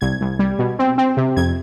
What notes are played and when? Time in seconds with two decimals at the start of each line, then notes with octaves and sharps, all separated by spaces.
0.01 C2 G#6
0.21 C2
0.39 G3
0.59 B2
0.79 C4
0.98 C4
1.17 C3
1.37 F2 G#6